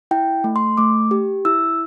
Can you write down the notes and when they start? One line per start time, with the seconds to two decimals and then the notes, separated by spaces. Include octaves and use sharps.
0.11 E4 G5
0.44 A3
0.56 C6
0.77 A3 D6
1.11 G4
1.45 E4 E6